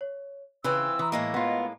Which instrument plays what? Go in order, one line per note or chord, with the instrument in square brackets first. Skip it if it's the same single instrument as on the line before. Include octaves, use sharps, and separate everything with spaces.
[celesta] C#5
[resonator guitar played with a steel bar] C#3 [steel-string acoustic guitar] E3 C4 F4 [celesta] B4 B5 F#6 [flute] E6
[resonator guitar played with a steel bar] E3 [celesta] A#5 C6 D#6
[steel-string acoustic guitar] A2 G#3 A#3 [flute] D#5 [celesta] E6
[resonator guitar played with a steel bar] B3 F4